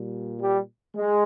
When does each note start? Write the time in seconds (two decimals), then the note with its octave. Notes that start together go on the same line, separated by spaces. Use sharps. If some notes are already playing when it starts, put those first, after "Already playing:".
Already playing: A#2 G3
0.40 G3
0.95 G#3